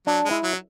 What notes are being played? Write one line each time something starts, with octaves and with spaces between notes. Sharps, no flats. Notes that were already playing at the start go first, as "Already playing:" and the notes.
F#3 D4
G#3
E4
F#3